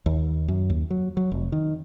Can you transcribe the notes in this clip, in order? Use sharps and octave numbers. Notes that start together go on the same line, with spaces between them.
D#2
F#2
D#2
F#3
F#3
F1
D#3